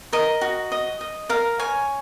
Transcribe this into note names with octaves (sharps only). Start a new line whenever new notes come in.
A#4 D#5
F#4
D#5
D#5
A#4 F5
C#5 G#5